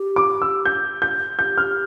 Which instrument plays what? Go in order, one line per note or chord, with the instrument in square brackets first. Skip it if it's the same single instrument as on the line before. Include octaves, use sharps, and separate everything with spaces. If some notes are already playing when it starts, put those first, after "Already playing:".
Already playing: [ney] G4
[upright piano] D6
E6
G6
G6
[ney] G4 [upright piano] G6
[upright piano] F6